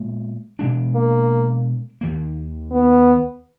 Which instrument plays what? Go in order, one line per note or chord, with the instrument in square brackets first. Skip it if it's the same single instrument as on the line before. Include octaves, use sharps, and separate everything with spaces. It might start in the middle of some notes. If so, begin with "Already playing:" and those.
Already playing: [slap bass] A#2 G#3 B3
B2 G#3 D4
[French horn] A#3
[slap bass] D#2 D#3 A#3
[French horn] B3